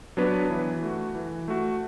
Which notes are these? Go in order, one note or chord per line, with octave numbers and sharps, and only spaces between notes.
F#3 B3 D4 B4
E3
A3 F#4
E3
A3 F#4